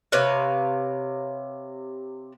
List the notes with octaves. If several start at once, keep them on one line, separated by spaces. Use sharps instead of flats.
C3 B4 C#5 F5